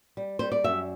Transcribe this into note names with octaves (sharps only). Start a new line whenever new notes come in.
G3
G3 C5
D5
F#2 E5